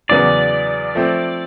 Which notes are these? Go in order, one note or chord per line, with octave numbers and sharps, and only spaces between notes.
E2 C#3 F#3 B3 D5
F3 A3 C4